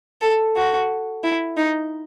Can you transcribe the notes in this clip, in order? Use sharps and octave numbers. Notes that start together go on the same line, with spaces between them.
A4
F#4
E4
D#4